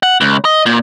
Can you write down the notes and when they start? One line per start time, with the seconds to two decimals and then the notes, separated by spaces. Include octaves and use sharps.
0.03 F#5
0.21 C#2
0.45 D#5
0.66 A#2